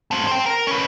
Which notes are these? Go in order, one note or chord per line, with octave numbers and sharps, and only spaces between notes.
A3 C4
C5 G5
A#4
C#4 B4